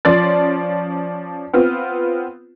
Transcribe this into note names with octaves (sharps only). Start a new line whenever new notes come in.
F3 C#4 D5 C6 A6
B3 C4 F4